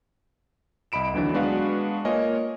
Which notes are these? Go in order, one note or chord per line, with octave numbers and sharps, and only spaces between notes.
C2 D#5 B5 D7 E7
D#2 D3 E3 F#3 D4
G#3 B3 D4 F#4 B4 F5
A#3 F4 A#4 C#5 D#5 G#5